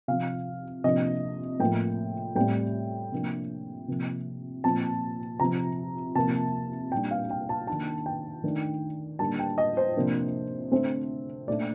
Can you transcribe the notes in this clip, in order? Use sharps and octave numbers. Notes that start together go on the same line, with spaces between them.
C3 F3 C4 F5
C3 F3 A#3 D4 D#5
A2 F3 A#3 G5
A2 G3 C4 G5
C3 F3 A#3 D4
C3 F3 A#3
A#2 F3 C4 A5
C3 F3 C4 A#5
C3 F3 A#3 A5
A#2 G3 D4 G5
F5
G5
A5
D#3 A#3 D4 A5
G5
D#3 A3 D4
D3 G3 A#3 D4 A5
G5
D#5
C5
C3 F3 A#3 D4
D3 A3 C4 C5
A#2 A3 D4 D5